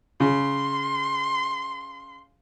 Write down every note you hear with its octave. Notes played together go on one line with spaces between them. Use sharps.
C#3 C6